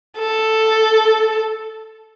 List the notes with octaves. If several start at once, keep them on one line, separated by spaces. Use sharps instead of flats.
A4